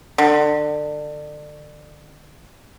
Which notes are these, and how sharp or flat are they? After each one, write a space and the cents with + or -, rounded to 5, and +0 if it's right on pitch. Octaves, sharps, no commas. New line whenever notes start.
D3 +30